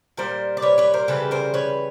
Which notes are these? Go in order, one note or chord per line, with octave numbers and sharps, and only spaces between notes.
A#2 G3 A#4 C5
D5
B4 C#5
B4 C#5
A#4 C5
C#3 E3 G3 A4 B4
A#4 C5
B4 C#5